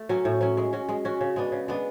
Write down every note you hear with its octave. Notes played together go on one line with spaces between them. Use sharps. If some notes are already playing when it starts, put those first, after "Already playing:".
Already playing: A3
F#3 C#4
A2
F#3 C#4
G#3
C#4 F#4
G#3
C#4 F#4
C#3
G#3 B3 D4
C#3
G#3 B3 D4